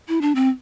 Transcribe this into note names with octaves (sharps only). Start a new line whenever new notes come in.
E4
D4
C4